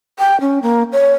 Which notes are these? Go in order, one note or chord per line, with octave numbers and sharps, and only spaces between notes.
G5
C#4
A#3
C#5